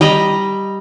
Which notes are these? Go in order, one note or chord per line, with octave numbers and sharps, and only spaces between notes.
G3 D#5 A#5 B5